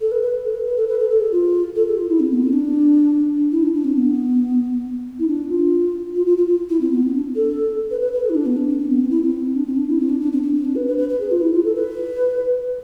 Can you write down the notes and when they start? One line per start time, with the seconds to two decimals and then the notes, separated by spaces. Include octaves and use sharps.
0.01 A4
0.11 B4
0.22 B4
0.44 A4
0.55 B4
0.66 B4
0.77 A4
0.88 B4
0.99 A4
1.10 A4
1.21 G#4
1.32 F4
1.75 A4
1.88 G#4
1.98 F4
2.09 E4
2.20 C4
2.32 B3
2.42 C4
2.53 D4
3.52 E4
3.63 D4
3.74 D4
3.84 C4
3.96 B3
5.19 E4
5.27 D4
5.49 F4
6.15 F4
6.26 F4
6.37 F4
6.47 F4
6.69 E4
6.81 C4
6.92 B3
7.03 C4
7.14 D4
7.35 A4
7.91 B4
8.01 B4
8.13 B4
8.24 A4
8.30 E4
8.35 D4
8.46 B3
8.57 D4
8.68 C4
8.79 C4
8.90 B3
9.01 C4
9.11 E4
9.23 C4
9.56 D4
9.66 C4
9.77 D4
9.89 E4
10.00 C4
10.10 D4
10.21 D4
10.33 C4
10.43 C4
10.54 C4
10.65 D4
10.75 B4
10.88 B4
10.98 B4
11.09 B4
11.20 G#4
11.31 F4
11.41 E4
11.53 F4
11.64 A4
11.75 B4